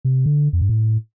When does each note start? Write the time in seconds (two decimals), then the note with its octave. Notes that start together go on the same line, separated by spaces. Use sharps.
0.05 C3
0.26 D3
0.53 F2
0.61 G2
0.69 A2